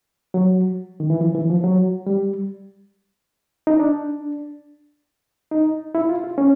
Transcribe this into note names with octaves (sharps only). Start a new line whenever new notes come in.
F#3
D#3
E3
F3
E3
F3
F#3
G3
D#4
D4
D#4
E4
F4
F4
C#4